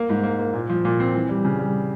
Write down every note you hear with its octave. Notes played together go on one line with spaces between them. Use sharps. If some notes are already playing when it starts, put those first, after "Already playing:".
Already playing: A#3
G#2
A#3
A#3
A#2
F3
A#2
C4
E3
G3
C#3
G3